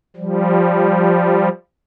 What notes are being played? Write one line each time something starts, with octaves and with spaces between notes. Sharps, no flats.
F3 G3